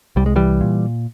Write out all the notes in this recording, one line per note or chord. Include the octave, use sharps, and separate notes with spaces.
C2 G3
G#3
E3 G3
A#2